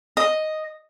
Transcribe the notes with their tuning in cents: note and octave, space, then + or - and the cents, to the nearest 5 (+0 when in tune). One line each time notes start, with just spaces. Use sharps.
D#5 +0